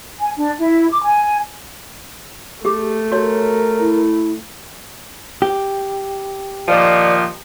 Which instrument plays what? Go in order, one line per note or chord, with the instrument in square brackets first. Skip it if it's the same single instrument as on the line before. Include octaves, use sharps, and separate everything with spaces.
[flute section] G#5
D4
E4
D6
G#5
[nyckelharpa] A3 [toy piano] G4 G#4
[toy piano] F#4 C#5 [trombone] A#4
[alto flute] E4
[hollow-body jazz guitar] G4
[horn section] A#2 D#3 F3 [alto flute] D5